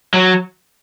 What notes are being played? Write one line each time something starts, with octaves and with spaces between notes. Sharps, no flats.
F#3